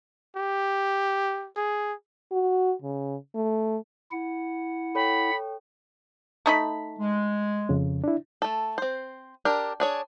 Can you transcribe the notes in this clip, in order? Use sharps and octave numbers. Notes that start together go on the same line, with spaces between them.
G4
G#4
F#4
C#3
A3
E4 F#5
A4 C#5 G5 B5
A3 D#4 B5
G#3
F2 C#3
D4 E4
A3 A4
C4 C5
D4 G4 A#4
D4 G#4 C#5